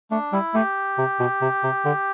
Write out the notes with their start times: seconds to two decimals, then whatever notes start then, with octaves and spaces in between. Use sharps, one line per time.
0.11 A3 D4
0.33 G3 E4
0.55 A3 G4
0.98 C3
1.20 B2
1.42 C3
1.64 C3
1.85 D3